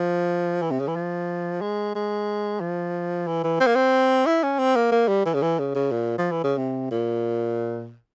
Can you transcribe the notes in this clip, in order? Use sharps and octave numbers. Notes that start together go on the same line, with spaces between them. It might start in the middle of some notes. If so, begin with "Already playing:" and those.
Already playing: F3
E3
C3
C#3
E3
F3
G#3
G#3
F3
E3
E3
C4
A#3
C4
E4
C#4
C4
A#3
A#3
G3
E3
C#3
E3
C#3
C#3
A#2
F3
E3
C#3
C3
A#2